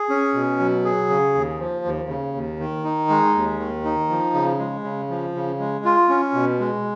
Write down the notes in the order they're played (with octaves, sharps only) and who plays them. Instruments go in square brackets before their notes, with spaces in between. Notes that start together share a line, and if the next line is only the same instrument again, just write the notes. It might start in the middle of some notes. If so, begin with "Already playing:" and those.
Already playing: [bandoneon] G#4
C#4
B2
F#3
G#4
C#3
D#2
F3
D#2
C#3
D#2
D#3
D#4
G#3
D#2
D#3
D#4
F3
C#3
G#3
C#3
F3
C#3
G#3
F4
C#4
B2
G#3